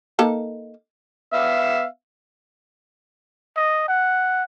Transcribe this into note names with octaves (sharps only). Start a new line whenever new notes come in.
A#3 D#4 A4
B3 E5 F5
D#5
F#5